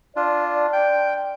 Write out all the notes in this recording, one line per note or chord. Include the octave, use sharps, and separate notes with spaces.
D4 F4 D5
G5